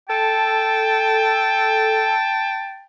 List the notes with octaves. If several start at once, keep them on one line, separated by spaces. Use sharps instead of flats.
A4 G5 A5